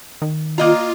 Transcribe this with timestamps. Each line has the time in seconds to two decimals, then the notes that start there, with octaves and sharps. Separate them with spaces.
0.22 D#3
0.58 A#3 F4 D#5 A#5